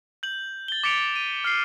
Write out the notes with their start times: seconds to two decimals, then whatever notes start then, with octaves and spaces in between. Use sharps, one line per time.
0.23 G6 F#7
0.68 A6 G7
0.83 D6 A6 B6 C#7 D7 F7
1.16 D#7
1.44 F6 C7